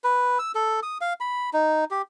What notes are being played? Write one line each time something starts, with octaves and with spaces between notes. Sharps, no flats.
B4
E6
A4
D#6
F5
B5
D#4
G4